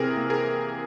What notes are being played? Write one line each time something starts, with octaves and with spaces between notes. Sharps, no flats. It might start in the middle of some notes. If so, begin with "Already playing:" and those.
Already playing: C3 E3 C4 G#4 A#4
A#3
G#4 A#4